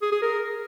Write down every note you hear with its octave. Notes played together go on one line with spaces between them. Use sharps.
G#4
G#4
A#4